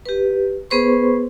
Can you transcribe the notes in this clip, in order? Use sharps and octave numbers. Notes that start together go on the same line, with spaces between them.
G4 B4
B3 G#4 B4 C5 C6 C#6